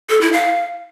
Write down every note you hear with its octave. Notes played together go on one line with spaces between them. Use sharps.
A4
E4
F5